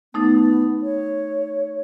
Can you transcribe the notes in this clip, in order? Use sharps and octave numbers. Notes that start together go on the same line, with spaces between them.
A3 B3 D#4 A6
C#5